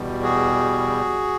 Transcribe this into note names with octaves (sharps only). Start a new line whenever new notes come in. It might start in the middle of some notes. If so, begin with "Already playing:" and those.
Already playing: E2 B2 G3
F#4 G#4